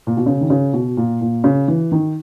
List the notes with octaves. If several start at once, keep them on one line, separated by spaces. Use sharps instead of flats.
A#2
B2
C#3
D#3
C#3
B2
A#2
A#2
C#3
E3
D#3